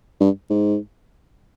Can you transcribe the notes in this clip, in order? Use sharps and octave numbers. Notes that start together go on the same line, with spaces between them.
G2
G#2